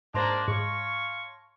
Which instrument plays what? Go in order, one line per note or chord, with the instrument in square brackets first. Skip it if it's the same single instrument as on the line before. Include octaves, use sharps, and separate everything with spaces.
[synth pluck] G#2 C5 A#5 [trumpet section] A#3 D4 [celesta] A5 C6 A#6
[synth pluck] G#2 [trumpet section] C#5 F5 C#6